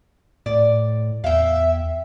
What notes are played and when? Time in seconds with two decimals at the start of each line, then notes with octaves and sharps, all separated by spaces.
0.46 A2 D5
1.24 E2 E5 F5 G5